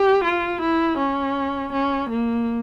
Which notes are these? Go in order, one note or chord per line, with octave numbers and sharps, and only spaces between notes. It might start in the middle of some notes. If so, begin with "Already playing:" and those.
Already playing: G4
F4
E4
C#4
C#4
A#3